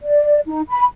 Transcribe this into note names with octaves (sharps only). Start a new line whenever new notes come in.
D5
D#4
B5